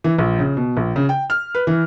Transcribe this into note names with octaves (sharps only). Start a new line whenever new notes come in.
E3
A#1
C#3
B2
A#1
C#3
G5
F6
B4
E3